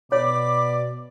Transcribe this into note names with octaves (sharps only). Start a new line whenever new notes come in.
B2 C#5 D5 B5 D6